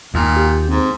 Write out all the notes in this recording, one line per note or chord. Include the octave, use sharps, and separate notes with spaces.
D#2 A#2
G4
G#2 C4